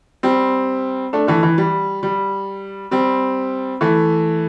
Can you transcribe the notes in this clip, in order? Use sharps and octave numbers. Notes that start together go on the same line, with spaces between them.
G3 C4
A3 D4
E3 A3
E3
G3
G3
G3 C4
E3 A3